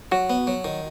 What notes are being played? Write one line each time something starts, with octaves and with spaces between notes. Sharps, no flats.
F#3 F#4
B3
F#3
D#3